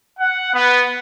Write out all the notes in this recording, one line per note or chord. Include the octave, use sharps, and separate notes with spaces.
F#5
B3